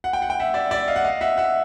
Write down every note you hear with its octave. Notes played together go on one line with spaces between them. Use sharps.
F#5
G5
F#5
G5
E5 F#5
D5 E5
D5 E5
D#5 F5
F#5
D#5 F5
E5 F#5
E5 F#5